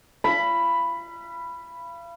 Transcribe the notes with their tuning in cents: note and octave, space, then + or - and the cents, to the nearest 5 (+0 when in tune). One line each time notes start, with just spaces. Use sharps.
F5 -40 B5 +0